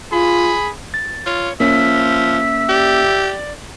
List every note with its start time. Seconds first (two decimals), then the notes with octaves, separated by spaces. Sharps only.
0.13 F4 G#4 B5
0.94 A6
1.26 F4 C#5
1.60 F3 A#3 C#4 E5 B6
2.69 G4 D5